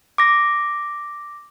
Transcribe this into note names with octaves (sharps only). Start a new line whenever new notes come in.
D6 A#6